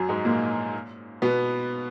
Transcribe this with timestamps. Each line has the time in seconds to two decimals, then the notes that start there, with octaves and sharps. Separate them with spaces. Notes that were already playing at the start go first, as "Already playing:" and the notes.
Already playing: F#2 F#3
0.09 G#2 G#3
0.25 A#2 A#3
1.22 B2 B3